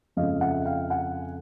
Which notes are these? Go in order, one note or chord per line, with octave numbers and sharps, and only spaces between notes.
F2 C#3 F3 G#3 C#4 D#5 F5
E5 F#5
F5 G5
F#5 G#5